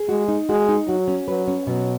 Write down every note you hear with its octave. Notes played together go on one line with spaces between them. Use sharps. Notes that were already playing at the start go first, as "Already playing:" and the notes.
Already playing: G#4
G#3 F#4
D#4
G#3 F#4
D#4
F#3 F#4
C#4
F#3 B4
C#4
B2 F#3